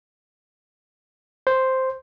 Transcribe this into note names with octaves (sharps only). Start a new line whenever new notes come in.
C5